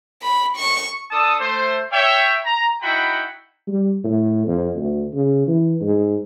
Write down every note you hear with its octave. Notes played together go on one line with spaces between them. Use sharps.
B5
C#6
D4 A4 A5 D#6
A3 C5
C#5 E5 G5
A#5
D#4 E4 F#4 F#5 G5 B5
G3
A2
F2
D2
C#3
E3
G#2